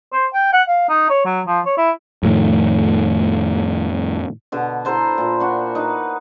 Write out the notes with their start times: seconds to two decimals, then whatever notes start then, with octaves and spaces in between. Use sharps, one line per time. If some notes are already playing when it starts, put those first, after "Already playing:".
0.12 C5
0.34 G5
0.53 F#5
0.68 F5
0.89 D#4
1.10 C#5
1.25 F#3
1.47 F3
1.66 C#5
1.78 E4
2.23 F2 A2 D#3
4.52 B2 D3
4.85 E4 A4 C5 A#5
5.18 A#2 E4
5.40 D4 F#4
5.75 D#4 B4